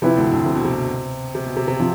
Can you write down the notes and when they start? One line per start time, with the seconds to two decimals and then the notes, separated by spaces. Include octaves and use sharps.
0.02 C3 F3 C4 E4 B4
0.16 D2 D3
0.32 D2 D3
0.46 C3
0.55 B2
0.65 C3
1.35 C3
1.46 B2
1.56 C3
1.68 C3
1.80 F3 C4